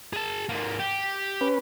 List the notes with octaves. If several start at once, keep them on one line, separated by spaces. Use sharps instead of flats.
G#4 A5
G#2 A#3
G4
C#4 B4